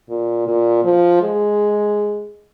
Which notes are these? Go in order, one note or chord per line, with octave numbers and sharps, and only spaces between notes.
A#2
A#2
F3
G#3